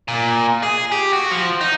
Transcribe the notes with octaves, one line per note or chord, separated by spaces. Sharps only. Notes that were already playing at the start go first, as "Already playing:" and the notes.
A#2
G#4
G4
F#4
F3
D#4